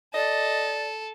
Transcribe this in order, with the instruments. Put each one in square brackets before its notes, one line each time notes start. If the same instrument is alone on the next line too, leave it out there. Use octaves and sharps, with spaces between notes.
[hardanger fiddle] A4 [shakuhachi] D5 [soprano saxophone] D#5